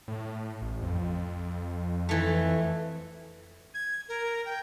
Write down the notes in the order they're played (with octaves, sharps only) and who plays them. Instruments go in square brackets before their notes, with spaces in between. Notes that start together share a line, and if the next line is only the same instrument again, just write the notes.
[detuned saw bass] A2
A1
F2
[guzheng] E3 A3
[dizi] G#6
A#4
G5